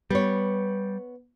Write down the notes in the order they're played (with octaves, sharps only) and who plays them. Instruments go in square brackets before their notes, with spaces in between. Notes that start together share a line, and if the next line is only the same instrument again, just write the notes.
[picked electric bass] G3 [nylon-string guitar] B3 C#5